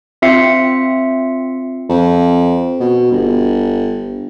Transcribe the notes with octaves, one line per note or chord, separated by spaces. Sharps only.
C4 F4 E5 C7 C#7
F2
B2
G1